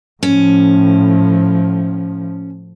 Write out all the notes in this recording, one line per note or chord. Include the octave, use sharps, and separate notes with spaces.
A2 F3 C#4